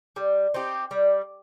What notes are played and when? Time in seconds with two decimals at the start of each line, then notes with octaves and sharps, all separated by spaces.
0.16 G3
0.54 C4 D#4 G4
0.91 G3